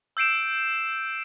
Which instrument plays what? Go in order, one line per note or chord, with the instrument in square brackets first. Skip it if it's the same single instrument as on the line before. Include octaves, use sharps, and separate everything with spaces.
[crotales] E6 G6 C7 D7 E7